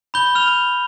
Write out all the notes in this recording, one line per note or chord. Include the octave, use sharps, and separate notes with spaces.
B5 G6 G7
F6 F7